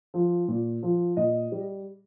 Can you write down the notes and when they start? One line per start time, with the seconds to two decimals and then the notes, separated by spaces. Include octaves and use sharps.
0.14 F3
0.48 A#2
0.83 F3
1.17 A#2 D#5
1.52 G3